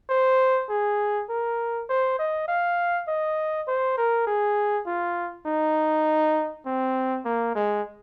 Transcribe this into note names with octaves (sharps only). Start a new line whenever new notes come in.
C5
G#4
A#4
C5
D#5
F5
D#5
C5
A#4
G#4
F4
D#4
C4
A#3
G#3